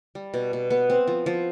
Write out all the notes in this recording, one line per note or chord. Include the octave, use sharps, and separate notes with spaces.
G3
B2
B2
B3
C4
F3
F3